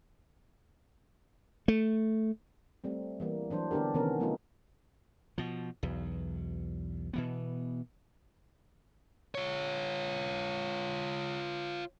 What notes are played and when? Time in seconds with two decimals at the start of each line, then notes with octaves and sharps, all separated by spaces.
1.68 A3
2.84 G3 A3 C4
3.20 E3 G3 A#3
3.50 E3 F#3 D4 C5
3.71 D3 B3 D4 G4 A#4
3.94 C3 D#3 E3 B3 C#4 A#4
4.20 F#3 A3 B3 D#4 F4
5.38 B2 F3
5.83 B1 E2
7.13 B2 E3 B3
9.35 F4 C#5